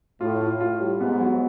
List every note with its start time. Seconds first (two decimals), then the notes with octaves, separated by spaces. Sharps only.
0.21 A2 F4
0.41 F4
0.60 A2 F4
0.81 G3
1.01 G#2 B3
1.21 F#3